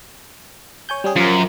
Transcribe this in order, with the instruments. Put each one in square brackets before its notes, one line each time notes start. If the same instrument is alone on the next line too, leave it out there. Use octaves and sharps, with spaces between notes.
[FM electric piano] C#5 G#5 G6
G3 C#4 G#4
[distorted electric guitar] F#2 [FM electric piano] F3 A#4